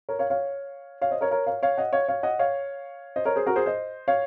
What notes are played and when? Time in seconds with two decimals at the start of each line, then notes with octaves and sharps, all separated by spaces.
0.09 A#4 C#5
0.19 C#5 F5
0.30 C#5 F5
1.01 C#5 F5
1.11 C5 D#5
1.21 A#4 C#5
1.31 A#4 C#5
1.46 C#5 F5
1.63 C#5 F5
1.78 D#5 F#5
1.93 C#5 F5
2.08 C#5 F5
2.23 D#5 F#5
2.39 C#5 F5
3.16 C5 D#5
3.25 A#4 C#5
3.36 G#4 C5
3.46 F#4 A#4
3.56 G#4 C5
3.66 C5 D#5
4.08 C#5 F5